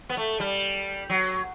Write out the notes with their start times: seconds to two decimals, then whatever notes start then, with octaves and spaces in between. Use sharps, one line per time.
0.09 B3
0.17 A3
0.40 G3
1.10 F#3